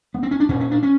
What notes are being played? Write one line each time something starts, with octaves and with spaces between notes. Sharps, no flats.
B3
C4
C#4
D4
A#2 C#4
C#4
D4
C#4